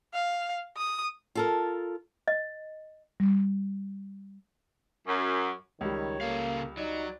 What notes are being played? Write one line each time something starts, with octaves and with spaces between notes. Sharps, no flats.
F5
D#6
F4 A4 A#4
D#5
G3
F#2
C#2 D#3 G3 C#5
C#3 A#3 A4 F5
F#3 D#4 D5